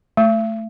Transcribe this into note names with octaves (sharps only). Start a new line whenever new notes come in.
A3